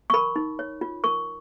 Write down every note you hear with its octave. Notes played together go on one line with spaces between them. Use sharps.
C#6
A#4 B5
D#4
C#5
F4
A#4 C#6